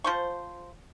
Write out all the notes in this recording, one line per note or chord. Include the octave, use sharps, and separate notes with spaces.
F3 C5 C#6